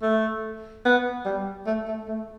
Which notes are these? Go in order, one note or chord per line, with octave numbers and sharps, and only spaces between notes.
A3
B3
G3
A3
A3
A3